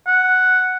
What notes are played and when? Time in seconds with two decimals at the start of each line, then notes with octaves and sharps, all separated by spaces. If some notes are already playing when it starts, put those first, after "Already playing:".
0.07 F#5